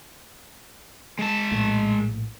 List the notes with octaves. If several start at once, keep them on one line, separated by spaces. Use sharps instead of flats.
G#3 A5
A#1 A2